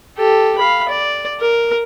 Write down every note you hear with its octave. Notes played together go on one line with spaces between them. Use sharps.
G4 A4
F5 B5
D5
A#4